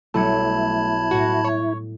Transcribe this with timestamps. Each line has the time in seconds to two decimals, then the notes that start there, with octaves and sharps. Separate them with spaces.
0.14 B1 G3 A3 E4 A5 B5 G#6 C#7
1.11 A2 F#4
1.44 C#5